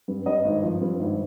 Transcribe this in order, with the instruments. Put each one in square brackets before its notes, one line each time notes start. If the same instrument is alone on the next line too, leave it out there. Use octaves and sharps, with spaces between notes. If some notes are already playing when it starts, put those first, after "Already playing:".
[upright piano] G2
G2 D#5
G#1
F3
G2
G#1